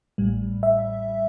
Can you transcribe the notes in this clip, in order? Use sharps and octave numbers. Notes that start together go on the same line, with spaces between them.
A1 A2 G3
E5